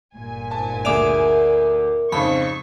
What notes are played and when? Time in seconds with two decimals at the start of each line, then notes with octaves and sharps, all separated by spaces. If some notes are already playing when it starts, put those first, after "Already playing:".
0.15 G1 A#2 G#5
0.51 G#2 A5
0.85 D2 G#4 A#4 D5 E5 D6 F7
2.12 F2 G#2 C#3 C4 B5 C#6